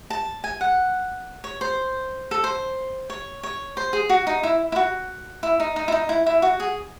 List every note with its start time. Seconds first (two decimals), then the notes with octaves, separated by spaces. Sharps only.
0.10 A5
0.44 G#5
0.61 F#5
1.44 C#5
1.61 C5
2.31 A4
2.44 C5
3.10 C#5
3.43 C#5
3.77 C5
3.93 G#4
4.09 F#4
4.27 D#4
4.43 E4
4.72 E4
4.76 F#4
5.43 E4
5.60 D#4
5.76 D#4
5.88 E4
5.92 D#4
6.09 E4
6.26 E4
6.42 F#4
6.60 G#4